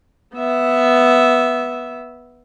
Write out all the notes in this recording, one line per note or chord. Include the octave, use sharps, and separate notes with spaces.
B3 E5